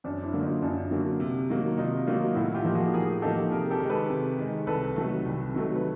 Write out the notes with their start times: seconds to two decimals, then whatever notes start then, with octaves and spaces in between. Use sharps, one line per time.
0.04 F#2 C4 D4
0.23 D4 E4
0.33 D3 F#3 A#3
0.43 D#4 F4
0.62 F#2 D4 E4
0.91 D3 F#3 A#3
1.20 C3
1.49 D#3 F#3 A#3
1.77 C3 D#4 F4
2.07 D#3 F#3 A#3 D#4 F4
2.35 A2 E4 F#4
2.54 F4 G4
2.65 F3 A#3 D#4
2.75 F#4 G#4
2.94 A2 G#4 A#4
3.22 F3 A#3 D#4 G4 A4
3.52 C3 G#4 A#4
3.71 G4 A4
3.80 D#3 G#3
3.90 A4 B4
4.10 C3
4.38 D#3 G#3
4.67 C2 A4 B4
4.96 C3 D#3 F#3 A3
5.26 C2
5.54 C3 D#3 F#3 A3
5.76 B4